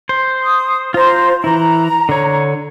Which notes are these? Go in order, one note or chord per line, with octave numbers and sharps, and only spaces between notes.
C5
D#6
F4 C5 A#5
E3 E4 A#5
D3 C#5